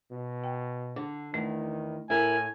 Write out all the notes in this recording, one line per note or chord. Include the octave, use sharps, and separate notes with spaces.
B2
G5
D3 D4
E2 D#3 A3
A2 E4 A#4 G#5